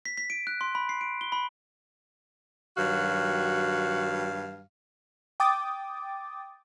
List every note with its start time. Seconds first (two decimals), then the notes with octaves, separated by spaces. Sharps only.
0.05 B6
0.17 B6
0.30 D7
0.47 F#6
0.61 C6
0.75 B5
0.89 C7
1.01 D7
1.21 G7
1.32 B5
2.77 G2 D#3 F#3 F#4 F5
5.40 G5 D6 D#6 A6